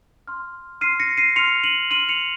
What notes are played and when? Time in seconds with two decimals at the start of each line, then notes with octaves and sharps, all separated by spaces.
0.27 C6 F6
0.81 C6 F6 C7 D#7
1.00 A#6 C#7
1.17 C7 D#7
1.36 C6 F6 C#7 F7
1.64 D#7 F#7
1.91 C6 F6 D#7 F#7
2.09 C#7 F7